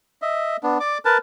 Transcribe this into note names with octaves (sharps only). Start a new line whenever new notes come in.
D#5 E5
B3 D4
D5 D6
A#4 B4 A5